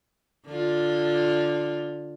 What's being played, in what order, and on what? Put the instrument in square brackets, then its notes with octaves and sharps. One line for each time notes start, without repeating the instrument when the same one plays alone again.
[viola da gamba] D3 F4